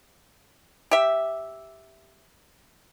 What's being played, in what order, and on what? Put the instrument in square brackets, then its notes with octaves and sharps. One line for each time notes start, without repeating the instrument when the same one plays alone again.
[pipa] G4 E5